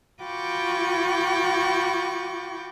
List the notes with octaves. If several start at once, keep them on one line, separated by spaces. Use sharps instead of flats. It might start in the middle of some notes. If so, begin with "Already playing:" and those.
F4 F#4 G5 B5 C#6 D6